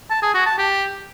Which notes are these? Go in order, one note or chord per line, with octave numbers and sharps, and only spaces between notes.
A5
G#4
F#4
A5
G4